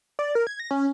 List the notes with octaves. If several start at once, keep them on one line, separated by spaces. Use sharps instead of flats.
D5
A#4
G#6
A#6
C#4